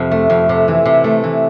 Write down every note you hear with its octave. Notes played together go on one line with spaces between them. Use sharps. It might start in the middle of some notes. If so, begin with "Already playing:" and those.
Already playing: F2 C3
A3
F2
C3
E3
C3
A3
E3